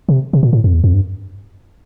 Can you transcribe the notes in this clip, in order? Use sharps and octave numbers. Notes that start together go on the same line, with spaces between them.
C3
C3
A#2
A2
F2
E2
F2
G2